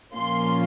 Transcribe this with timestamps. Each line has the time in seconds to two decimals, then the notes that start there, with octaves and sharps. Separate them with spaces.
0.15 A#2 F3 A#3 C#4 F4 C6